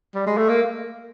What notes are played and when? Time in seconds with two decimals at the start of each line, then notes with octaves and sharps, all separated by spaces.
0.15 G3
0.26 G#3
0.37 A3
0.49 A#3